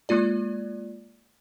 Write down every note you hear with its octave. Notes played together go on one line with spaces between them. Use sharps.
G#3 A#3 F4 D5